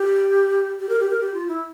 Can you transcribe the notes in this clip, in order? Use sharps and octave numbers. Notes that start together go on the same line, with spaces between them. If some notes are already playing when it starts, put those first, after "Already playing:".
Already playing: G4
G4
A#4
G4
A#4
G4
F4
E4